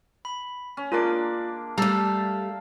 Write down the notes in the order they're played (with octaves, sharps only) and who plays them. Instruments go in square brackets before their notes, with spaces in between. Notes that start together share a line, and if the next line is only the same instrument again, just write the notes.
[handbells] B5
[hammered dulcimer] C#4
[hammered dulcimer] G#3 A#3 D4 [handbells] F4 A#4 D6
[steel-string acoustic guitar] G3 A3 [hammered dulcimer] F5 A5 [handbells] A#5 E6